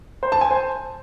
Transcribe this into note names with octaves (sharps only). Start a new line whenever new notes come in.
C5
A5
G#5
C5